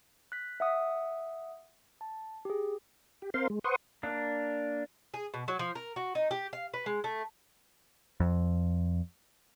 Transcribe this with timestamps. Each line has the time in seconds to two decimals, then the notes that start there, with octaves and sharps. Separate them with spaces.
0.32 F#6 B6
0.60 E5 F#5 D#6
2.01 A5
2.45 G4 G#4
3.22 G4
3.34 C4 A#4 C5 F5 C6
3.50 G#3
3.64 B4 C5 F#5 C6 C#6 D#6
4.03 A#3 D4
5.14 G#4
5.34 B2
5.48 F#3
5.59 F3
5.75 A#4
5.96 F#4
6.15 D#4
6.31 G4
6.53 F5
6.74 B4
6.86 G#3
7.04 A3
8.20 F2